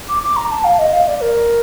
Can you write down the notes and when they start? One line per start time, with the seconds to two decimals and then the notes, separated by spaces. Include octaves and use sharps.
0.09 D6
0.23 D6
0.36 A#5
0.51 A5
0.64 F5
0.79 D#5
0.93 F5
1.07 D5
1.21 A#4